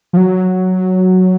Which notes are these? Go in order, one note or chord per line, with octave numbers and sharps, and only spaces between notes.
F3
F#3